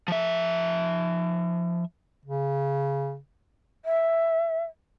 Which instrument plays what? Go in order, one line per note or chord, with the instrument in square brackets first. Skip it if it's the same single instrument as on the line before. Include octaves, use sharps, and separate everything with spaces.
[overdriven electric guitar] F3 E5
[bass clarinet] C#3
[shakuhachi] E5